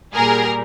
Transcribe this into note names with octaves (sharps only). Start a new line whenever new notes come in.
A#2 G3 G#4 A#4